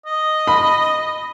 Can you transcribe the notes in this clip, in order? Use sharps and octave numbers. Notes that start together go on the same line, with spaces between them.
D#5
B5